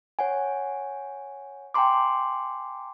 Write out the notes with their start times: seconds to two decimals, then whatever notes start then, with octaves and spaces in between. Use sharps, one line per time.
0.19 C#5 F#5 G#5
1.74 G5 G#5 A#5 C6 D6